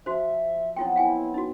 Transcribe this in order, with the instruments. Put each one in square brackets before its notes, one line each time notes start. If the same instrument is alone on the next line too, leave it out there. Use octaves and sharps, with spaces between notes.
[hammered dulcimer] F3 [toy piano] F#4 C5 [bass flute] E5
[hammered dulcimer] F#3 B3 C4 [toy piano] E4 F4 G5
[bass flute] E4 [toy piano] F5 G5 G#5
[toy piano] D#4 F#4